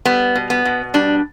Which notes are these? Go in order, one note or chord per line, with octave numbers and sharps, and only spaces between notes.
G3 B3
B2
B3
B2
G3 D4